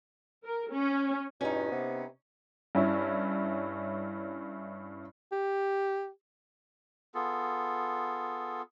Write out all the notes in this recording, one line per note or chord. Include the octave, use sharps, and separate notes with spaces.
A#4
C#4
E2 G2 B2 C#4 D#4
C3 B3
G2 C#4 E4
G4
B3 F4 G#4 A4